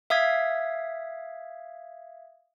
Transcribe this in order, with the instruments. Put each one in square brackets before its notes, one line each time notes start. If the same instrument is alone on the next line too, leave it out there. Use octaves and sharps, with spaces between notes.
[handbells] E5 F5 D#6 G#6 B6